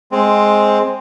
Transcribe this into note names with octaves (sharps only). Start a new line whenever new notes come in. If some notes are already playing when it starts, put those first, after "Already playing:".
G#3 C4